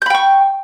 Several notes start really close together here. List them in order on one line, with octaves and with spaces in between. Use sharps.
G6 B5 G5 C#6